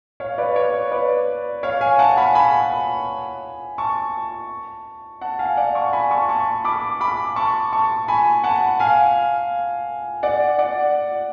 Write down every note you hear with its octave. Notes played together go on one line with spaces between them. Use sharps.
C#5 F5
B4 D5
C#5
C#5
B4 D5
C#5 F5
F5 G#5
F#5 A5
G#5 B5
G#5 B5
A5 C#6
F#5 A5
F5 G#5
D5 F#5
A5 C#6
G#5 B5
A5 C#6
A5 C#6
B5 D6
B5 D6
A5 C#6
A5 C#6
G#5 B5
F#5 A5
F5 G#5
D5 F#5
D5 F#5